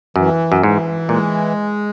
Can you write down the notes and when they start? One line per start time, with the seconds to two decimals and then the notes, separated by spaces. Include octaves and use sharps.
0.16 F#2 E3
0.52 F#2
0.62 G#2 E3
1.09 A#2 G#3